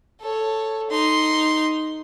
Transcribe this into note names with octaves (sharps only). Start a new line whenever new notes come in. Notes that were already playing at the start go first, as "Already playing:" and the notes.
A4 C#5
D#4 C6